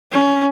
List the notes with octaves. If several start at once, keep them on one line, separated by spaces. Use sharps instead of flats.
C#4